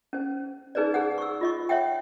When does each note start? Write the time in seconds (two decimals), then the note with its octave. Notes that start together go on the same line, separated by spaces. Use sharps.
0.13 C#4 C5
0.75 D#4 G#4 B4 C5 D5
0.94 G#4 C5 F#5
1.18 C#6 E6
1.41 F4 D#5 C#6
1.69 C#5 E5 F#5 G5